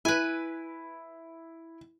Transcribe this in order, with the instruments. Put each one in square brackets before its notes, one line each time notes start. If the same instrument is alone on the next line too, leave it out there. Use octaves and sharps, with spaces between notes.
[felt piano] E4 [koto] B4 G#5